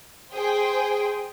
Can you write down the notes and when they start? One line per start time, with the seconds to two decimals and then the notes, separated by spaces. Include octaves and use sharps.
0.33 G#4 C5 G5